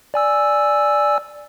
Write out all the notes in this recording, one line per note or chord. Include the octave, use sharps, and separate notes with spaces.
D5 G#5 E6